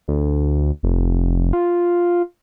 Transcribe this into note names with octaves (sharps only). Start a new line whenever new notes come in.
D2
F1
F4